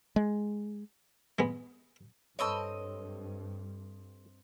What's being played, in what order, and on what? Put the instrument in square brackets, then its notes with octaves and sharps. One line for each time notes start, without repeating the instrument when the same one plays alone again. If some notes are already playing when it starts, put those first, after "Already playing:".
[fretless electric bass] G#3
[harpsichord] G#3 B3
[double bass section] G2 [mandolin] C4 D#5 E6 [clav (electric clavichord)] A4 B4 C#5